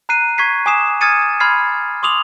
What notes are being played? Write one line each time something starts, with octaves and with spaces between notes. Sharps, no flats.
A#5 F#6 C7 D#7
C#6 G#6 B6 C7
G#5 D6 D#6 C7 E7
D#6 F6 G#6 A6 C#7 D#7
B5 C6 F6 G#6 A6 C7
C6 D6 D#6 F7 F#7